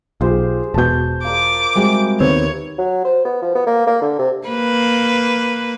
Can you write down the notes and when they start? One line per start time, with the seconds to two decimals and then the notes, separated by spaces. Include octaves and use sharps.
0.21 B1 F4 G4 G#4 C5
0.74 E1 B2 A5 G6
1.24 F4 A#4 D#5 D6
1.75 C3 G3 G#3 F#4
2.21 D#2 B3 C4 C#5
2.78 F#3
3.05 C5
3.25 B3
3.42 F3
3.55 B3
3.67 A#3
3.87 A#3
4.02 D3
4.19 C3
4.47 A#3 B4